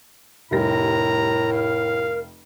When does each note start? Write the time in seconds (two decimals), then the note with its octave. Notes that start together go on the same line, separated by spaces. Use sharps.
0.51 F1 A2 G3 A#4 A#5 A#6
1.52 F5